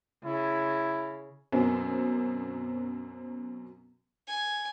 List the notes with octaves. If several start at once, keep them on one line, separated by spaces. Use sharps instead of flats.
C#3 E4
F#2 B2 F#3 A#3 C4
G#5